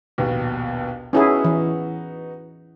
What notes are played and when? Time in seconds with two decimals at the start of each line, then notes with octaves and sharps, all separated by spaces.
0.18 A#1 D#2 B2
1.13 B3 C#4 D#4 E4 F#4 G#4
1.45 E3